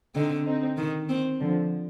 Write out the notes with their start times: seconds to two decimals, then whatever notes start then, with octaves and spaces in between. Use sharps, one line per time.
0.15 D3 C4 D#4
0.46 C4 D#4
0.77 D#3
1.09 C4
1.40 D3 F3